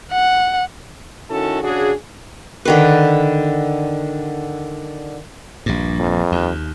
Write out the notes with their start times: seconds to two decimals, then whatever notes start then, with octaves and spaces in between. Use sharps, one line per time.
0.12 F#5
1.30 D#3 C#4 E4 F#4 A4
1.63 C#3 D4 F#4 G#4
2.65 D3 D#3 B4
5.66 A#1 G2
6.00 F2
6.32 D#2